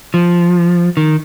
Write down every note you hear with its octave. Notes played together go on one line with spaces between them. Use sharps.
F3
D#3